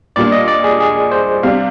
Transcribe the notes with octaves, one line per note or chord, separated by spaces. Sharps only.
A#2 G3 A#3 D4 D5
D#5
D5
G#4
G#4
C5
C3 G3 D4 F5